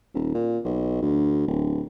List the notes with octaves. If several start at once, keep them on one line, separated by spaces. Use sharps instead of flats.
D#1
A#2
B1
D2
D1